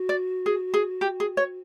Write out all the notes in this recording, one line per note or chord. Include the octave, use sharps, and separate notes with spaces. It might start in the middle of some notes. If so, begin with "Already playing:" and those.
Already playing: F#4
D5
G#4
G#4
G4
G#4
C#5